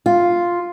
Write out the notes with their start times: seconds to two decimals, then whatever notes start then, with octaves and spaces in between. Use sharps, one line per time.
0.06 F4